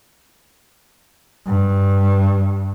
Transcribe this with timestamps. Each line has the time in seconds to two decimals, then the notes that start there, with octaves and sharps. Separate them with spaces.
1.47 G2